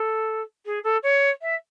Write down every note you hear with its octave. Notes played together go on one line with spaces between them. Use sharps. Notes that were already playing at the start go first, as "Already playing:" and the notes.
Already playing: A4
G#4
A4
C#5
E5